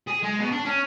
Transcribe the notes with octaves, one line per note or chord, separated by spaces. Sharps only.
G#4
G#3
B2
D4
C#4